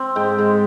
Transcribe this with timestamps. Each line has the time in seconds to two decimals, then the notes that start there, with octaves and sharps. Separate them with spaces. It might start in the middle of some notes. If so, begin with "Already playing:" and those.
Already playing: C4
0.16 G#2 G5
0.39 G#2